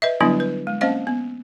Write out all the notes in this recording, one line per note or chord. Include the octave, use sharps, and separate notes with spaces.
B4 D#5 E5
D3 F#3 G3 B3 D4 E4
B4
G#3
A#3 C4 C#4 C5 D#5 F5
B3